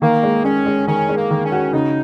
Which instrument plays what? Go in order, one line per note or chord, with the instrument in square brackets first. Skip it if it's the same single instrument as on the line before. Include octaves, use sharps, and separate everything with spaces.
[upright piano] D#3 [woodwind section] A#3
[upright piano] G#3
[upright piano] G#3 [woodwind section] C#4
[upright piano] G#3
[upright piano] D#3 [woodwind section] C#4
[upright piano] G#3
[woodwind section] A#3
[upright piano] D#3
[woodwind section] C#4
[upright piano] F#4
[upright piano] C#3 [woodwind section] D#4